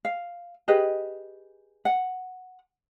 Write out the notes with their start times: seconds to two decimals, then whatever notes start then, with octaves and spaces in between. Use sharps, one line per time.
0.05 F5
0.68 G4 G#4 B4 D#5
1.85 F#5